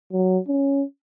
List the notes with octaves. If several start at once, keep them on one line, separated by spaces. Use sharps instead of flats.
F#3
C#4